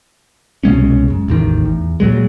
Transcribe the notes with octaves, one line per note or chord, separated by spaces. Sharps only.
C2 B2 G#3 C#4
F#2
A1 E2 D#3
E2
A#2 F#3 G#3